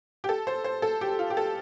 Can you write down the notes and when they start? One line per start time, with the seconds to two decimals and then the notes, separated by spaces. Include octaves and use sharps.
0.24 G4
0.29 A4
0.47 C5
0.64 C5
0.82 A4
1.01 G4
1.19 F4
1.30 G4
1.37 A4